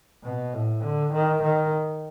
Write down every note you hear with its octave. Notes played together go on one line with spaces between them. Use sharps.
B2
A2
D3
D#3
D#3